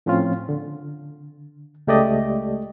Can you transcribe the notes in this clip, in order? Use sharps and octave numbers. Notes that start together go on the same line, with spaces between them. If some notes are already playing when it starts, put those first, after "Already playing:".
A2 F3 C4 C#4 F4
D3
C#2 G#3 A3 G4 D5 D#5